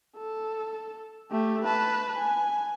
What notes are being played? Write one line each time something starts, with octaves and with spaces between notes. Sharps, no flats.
A4
A3 G4
B4 A5
G#5